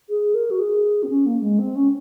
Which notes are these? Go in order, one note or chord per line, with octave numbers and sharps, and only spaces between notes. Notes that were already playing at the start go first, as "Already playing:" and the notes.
G#4
A#4
F#4
G#4
C4
C#4
A#3
G#3
C4
C#4